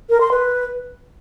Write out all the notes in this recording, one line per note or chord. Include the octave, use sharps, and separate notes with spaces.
A#4
C6
B4